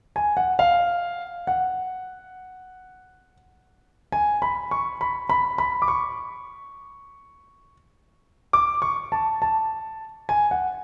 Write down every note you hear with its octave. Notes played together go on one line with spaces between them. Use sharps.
G#5
F#5
F5
F#5
G#5
B5
C#6
B5
B5
B5
D6
C#6
D6
C#6
A5
A5
G#5
F#5